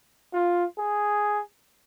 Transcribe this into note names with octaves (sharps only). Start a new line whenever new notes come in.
F4
G#4